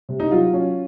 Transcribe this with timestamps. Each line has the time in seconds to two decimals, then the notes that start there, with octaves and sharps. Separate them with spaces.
0.09 C3
0.20 D#4
0.31 F#3 F4
0.53 C#4